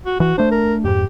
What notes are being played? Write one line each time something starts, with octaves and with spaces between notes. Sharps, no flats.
F#4
E3 F#4
A3 D4 C5
A#4
F2 G#2 G4